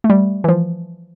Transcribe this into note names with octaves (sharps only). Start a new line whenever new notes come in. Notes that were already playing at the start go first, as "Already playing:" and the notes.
A3
G3
E3
F3